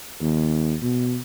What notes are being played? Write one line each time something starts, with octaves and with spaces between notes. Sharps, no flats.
D#2
B2